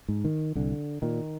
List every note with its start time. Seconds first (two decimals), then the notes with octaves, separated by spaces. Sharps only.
0.08 G#2
0.25 D#3
0.55 C2 D3
1.02 A#2 D#3